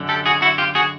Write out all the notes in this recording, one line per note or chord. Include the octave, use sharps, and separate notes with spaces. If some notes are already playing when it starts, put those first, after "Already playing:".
Already playing: F#2 D3
G4 A4
F#4 G#4
E4 F#4
F4 G4
F#4 G#4